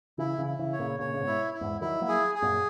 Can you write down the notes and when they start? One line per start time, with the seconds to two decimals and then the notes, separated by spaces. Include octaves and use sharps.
0.18 C#3 E3 E4
0.38 C#3 E3
0.46 E4
0.59 C#3 E3
0.73 C#5
0.79 A#2 C#3
1.00 A#2 C#3 C#5
1.14 C#3
1.20 G#2 B2
1.27 E4
1.54 E4
1.61 E2 G#2
1.81 D#3 F#3 E4
2.01 F#3 A#3
2.08 G#4
2.35 G#4
2.42 F#2 A#2